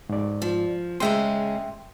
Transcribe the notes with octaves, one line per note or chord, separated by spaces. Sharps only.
G#2 D5
F3
C#3 G#3 C#4 E5 G5 C6